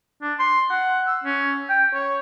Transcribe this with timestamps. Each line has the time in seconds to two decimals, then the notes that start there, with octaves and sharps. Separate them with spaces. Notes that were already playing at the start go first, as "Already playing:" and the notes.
0.22 D4
0.39 C6
0.70 F#5
1.07 E6
1.24 C#4
1.69 G5
1.93 C#5